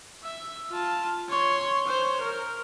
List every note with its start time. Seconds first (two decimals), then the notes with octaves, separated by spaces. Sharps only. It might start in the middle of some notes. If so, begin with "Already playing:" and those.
0.23 E5
0.70 F4 A5
1.29 C#5 C6
1.87 C5 C#5
2.21 A#4